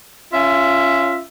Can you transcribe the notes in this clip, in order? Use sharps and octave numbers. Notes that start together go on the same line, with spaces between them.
C#4 F4 E5